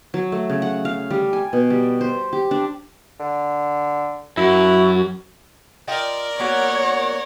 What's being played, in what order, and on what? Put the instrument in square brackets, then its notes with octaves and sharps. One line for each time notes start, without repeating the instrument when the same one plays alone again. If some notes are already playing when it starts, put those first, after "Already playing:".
[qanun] F#3
A3
C#3
F#5
F5
G3
G#5
B2
G3
C5
G4
D4
[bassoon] D3
[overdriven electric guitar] F#2 [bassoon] E4 [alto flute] F#4
[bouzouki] F4 D#5 G5 [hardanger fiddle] A#4 D5
[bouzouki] A#3 B3 F#4 [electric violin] C#5